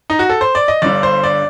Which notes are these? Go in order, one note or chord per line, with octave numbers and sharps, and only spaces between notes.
D#4
F#4
A4
C5
D5
D#5
G1 G2 D3 D5
C5
D5